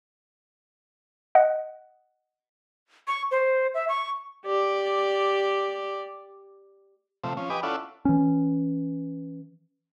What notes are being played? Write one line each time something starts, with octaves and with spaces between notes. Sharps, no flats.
D#5 F#5
C#6
C5
E5
C#6
G4 D5
C3 F3 A3
F3 C#4
G4 B4 D#5 G#5 D6
C#4 E4 F4 A4 D5 F#5
E3 C#4